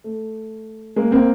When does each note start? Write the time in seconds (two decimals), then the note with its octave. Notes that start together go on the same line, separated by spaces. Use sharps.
0.04 A3
0.96 G#3 A#3
1.11 A#3 C4